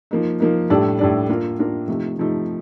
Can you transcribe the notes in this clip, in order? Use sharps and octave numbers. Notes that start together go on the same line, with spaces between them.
F3 A#3 D#4
F3 A#3 D#4
A2 G3 D4 A4 D5
A2 G3 D4 A4 D5
A#3 D4 F4 A#4
A#3 D4 F4 A#4
C3 F3 A3 D#4
C3 F3 A3 D#4